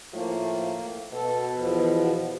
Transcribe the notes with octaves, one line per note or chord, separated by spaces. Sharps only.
A2 F3 A3 A#3
B2 A4
E2 F3